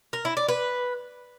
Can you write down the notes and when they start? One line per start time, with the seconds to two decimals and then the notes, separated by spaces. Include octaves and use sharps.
0.13 A#4
0.25 E4
0.37 D5
0.49 B4